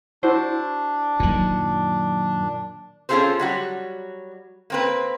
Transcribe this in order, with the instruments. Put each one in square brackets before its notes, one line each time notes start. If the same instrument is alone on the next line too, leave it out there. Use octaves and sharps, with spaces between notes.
[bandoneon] D4 [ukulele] E4 F#4 C5
[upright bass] F#2 F#3 [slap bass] A#2 D#3
[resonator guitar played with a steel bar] C4 C#4 F4 G#4 A4 C5
F#3 G3 F#4
A#3 C4 B4